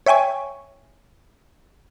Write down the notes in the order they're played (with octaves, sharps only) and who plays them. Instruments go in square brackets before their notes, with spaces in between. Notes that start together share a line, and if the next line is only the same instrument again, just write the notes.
[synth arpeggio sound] C#5 E5 G5 G#5 C#6